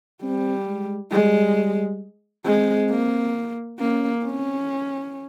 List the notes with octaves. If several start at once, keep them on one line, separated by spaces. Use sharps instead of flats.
G3 C4
G#3
G3 G#3
G#3 C4
A#3
A#3 C#4
C4 C#4